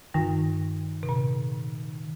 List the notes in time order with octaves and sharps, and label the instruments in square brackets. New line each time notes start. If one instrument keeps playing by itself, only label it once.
[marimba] G2 [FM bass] D#3
[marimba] C3
A#2